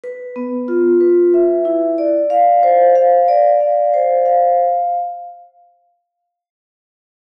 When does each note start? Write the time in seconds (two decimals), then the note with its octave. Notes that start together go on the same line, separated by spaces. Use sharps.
0.04 B4
0.36 B3
0.68 F4
1.01 B4
1.34 E5
1.65 E4
1.98 D5
2.30 F5
2.63 C5
2.95 F5
3.28 D5
3.60 F5
3.94 C5
4.26 F5